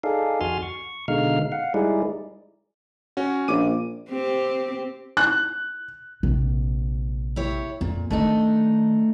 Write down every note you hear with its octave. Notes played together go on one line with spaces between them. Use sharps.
D#4 G#4 A4 D5 F5
F2 F#4 G#5 C6 F6 A6
C#6
B2 D3 G#3 D#4 F5 F6
F5 F#5
G3 G#3 D#4 E4 G#4 D5
C#4 F#4
A#1 D6 D#7
C4 G4
F#6
A#1 C3
E4 G4 C#5
F2 A#2
D#3 A3 C4 D4 D#4